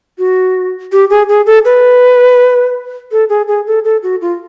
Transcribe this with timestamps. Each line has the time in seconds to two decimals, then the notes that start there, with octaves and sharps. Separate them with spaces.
0.18 F#4
0.92 G4
1.10 G#4
1.29 G#4
1.46 A4
1.65 B4
3.12 A4
3.29 G#4
3.48 G#4
3.67 A4
3.85 A4
4.03 F#4
4.21 F4